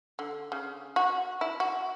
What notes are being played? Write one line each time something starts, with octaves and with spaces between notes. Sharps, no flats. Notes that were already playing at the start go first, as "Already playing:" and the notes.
D3
C#3
F#4
E4
F#4